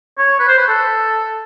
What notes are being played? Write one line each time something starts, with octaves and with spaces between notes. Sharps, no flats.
C#5
B4
C5
B4
A4